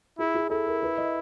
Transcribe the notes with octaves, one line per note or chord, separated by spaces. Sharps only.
E4 G#4
G#4
E4 A4
A#4
B4
D#5